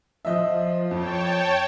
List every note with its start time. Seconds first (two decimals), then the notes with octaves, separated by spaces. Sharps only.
0.25 F3 D#5 E5
0.91 F2 C#5 G5 A5